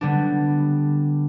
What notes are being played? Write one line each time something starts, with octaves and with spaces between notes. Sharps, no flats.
D3 G3 B3 D4